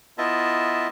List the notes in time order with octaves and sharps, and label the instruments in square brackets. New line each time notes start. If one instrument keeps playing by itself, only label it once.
[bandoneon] B3 E4 F4 D#5 E5 A5